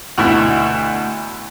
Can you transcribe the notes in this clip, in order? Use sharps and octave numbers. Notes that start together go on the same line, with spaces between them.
D2 B2 E4